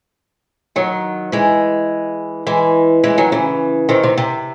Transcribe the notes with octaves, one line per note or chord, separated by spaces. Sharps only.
D#3 F#3
E3 G#3
E3 G#3
E3 G#3
D#3 F#3
C#3 E3
C3 D#3
C3
C3